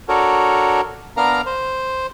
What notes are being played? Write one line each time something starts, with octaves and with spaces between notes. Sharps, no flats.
D4 F#4 A4 A#4 C#5
B3 D4 A#4 F5 A#5 F6
C5